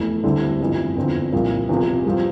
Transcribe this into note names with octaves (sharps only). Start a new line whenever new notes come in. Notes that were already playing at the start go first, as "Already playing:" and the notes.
Already playing: F1 E2 E3 A3
D2 D3 G3 C4 E4
G1 F2 E3
E2 D3 F3 C4
C2 A#2 F3
E1 E2 C3 F3
G2 F3 C4